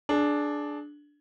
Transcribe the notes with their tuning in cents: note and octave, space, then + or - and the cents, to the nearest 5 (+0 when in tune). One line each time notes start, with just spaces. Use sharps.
D4 +0 G#4 +25